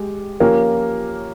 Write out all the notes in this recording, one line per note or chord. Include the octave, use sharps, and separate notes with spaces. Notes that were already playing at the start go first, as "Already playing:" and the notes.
Already playing: G#3 G4
F3 A#3 C#4 G4 A#4